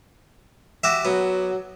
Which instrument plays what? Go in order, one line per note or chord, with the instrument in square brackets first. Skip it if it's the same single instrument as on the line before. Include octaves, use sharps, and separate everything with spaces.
[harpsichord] F#4 G4 E5
[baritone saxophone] F#3 [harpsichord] B3